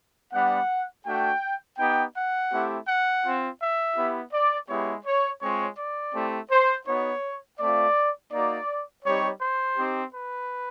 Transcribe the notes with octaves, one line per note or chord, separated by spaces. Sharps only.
G3 B3 D4 F#5
A3 D4 F#4 G5
B3 D#4 G4 G5
F#5
A3 C4 E4 G4
F#5
C4 F4
E5
B3 E4 G4
D5
G#3 B3 E4 G4 C#5
C#5
G#3 C4 F4 C#5
D5
A3 C4 E4 G4
C5
B3 D#4 F#4 C#5
A3 C4 F4 D5
A#3 D#4 F#4 D5
G3 C4 D#4 G4 C#5
C5
C4 D#4 G4
B4